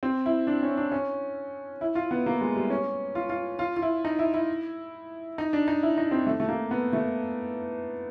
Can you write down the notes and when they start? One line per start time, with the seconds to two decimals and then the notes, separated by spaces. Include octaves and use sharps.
0.03 C4
0.26 E4
0.47 D4
0.63 C#4
0.77 D4
0.92 C#4
1.81 E4
1.95 F4
2.11 B3
2.26 A#3
2.41 G#3
2.55 G3
2.70 C#4
3.15 F4
3.30 F4
3.59 F4
3.77 F4
3.82 E4
4.05 D#4
4.19 E4
4.34 E4
5.38 D#4
5.53 D4
5.68 D#4
5.83 E4
5.98 D#4
6.11 C4
6.27 A3
6.40 A3
6.48 A#3
6.71 B3
6.93 A3